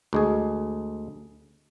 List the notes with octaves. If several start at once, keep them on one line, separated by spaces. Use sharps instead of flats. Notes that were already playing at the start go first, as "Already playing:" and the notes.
D2 G#3 G#4